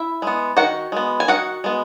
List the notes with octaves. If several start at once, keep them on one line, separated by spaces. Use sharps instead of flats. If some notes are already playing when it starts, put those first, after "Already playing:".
Already playing: E4 E5
G#3 B3
D#3 F#4 F#5
G#3 B3
G#5
D#3 F#4 F#5
G#3 B3